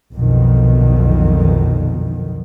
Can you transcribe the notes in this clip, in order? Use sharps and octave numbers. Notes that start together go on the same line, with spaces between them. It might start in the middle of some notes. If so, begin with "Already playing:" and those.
B1 F2 B2 D3 D#3